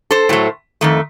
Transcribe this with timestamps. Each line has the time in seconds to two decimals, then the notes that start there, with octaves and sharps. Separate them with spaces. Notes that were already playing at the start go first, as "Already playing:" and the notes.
0.11 A4 C5
0.29 A2 F#3 A3
0.81 F2 D#3 A3